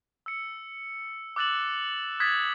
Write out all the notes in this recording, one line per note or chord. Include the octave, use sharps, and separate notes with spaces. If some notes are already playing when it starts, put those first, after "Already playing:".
E6 C#7
D6 E6 F#6 A6 E7 F#7
D#6 F#6 G#6 A6 B6